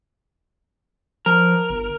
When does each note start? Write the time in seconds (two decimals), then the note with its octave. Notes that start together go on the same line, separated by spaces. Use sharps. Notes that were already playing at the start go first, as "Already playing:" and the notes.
1.26 F3 A#4
1.70 G1